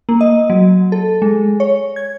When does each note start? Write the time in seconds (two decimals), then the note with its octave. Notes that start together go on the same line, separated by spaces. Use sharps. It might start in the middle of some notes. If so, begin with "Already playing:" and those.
0.09 A#3
0.21 D#5
0.50 F#3
0.92 A4
1.22 G#3
1.60 C#5
1.96 G#6